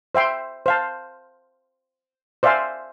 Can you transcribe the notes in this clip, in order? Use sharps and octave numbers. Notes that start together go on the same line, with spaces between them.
C5 E5 G5 C6
C5 F5 A5
C5 D5 E5 F5 G#5 C6